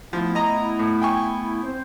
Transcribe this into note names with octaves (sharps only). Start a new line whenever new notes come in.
F3 A3 B3 E4
D#5 A#5
A2
G5 G#5 C#6
C4 C5